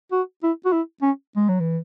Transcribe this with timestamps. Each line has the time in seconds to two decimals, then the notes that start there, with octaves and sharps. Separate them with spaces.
0.12 F#4
0.43 E4
0.65 F#4
0.72 E4
1.02 C#4
1.36 G#3
1.48 F#3
1.60 E3